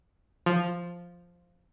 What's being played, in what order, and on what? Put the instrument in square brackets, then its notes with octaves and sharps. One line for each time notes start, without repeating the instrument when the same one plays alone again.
[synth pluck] F3